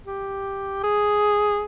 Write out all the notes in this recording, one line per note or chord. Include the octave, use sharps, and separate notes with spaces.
G4
G#4